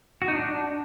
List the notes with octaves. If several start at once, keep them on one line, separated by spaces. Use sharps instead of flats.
F#4
D#4
D4